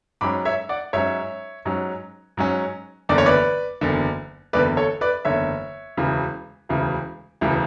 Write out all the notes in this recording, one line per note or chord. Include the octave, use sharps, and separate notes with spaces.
G#2 F#3 C#4 B5 D6
C#5 E5
D5 F#5
G#2 F#3 C#4 C#5 E5
G#2 F#3 C#4
G#2 F#3 C#4
F#1 E2 D3 D5
C#5
B4 D5
F#1 E2 D3
F#1 E2 D3 B4 D5
A4 C#5
B4 D5
F#1 E2 D3 C#5 E5
E1 D2 C#3 E3
E1 D2 C#3 E3
E1 D2 C#3 E3